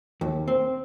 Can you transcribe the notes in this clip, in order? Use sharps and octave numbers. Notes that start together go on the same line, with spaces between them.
D#2
C4